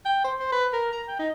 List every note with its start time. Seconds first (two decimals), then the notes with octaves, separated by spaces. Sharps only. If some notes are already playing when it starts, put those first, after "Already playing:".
0.05 G5
0.24 C5
0.39 C5
0.52 B4
0.73 A#4
0.92 A#5
1.08 G5
1.19 D#4